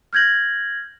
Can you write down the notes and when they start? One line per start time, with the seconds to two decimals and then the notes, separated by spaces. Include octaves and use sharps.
0.13 F6 G6 G#6 A#6 F#7